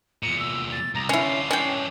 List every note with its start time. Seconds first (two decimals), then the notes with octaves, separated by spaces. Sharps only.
0.23 E2 A#2 C#7
0.39 E6
0.72 A6
0.95 C2 A#5
1.09 D3 C#4 E4 F4 C7
1.51 E3 C#4 D4 G5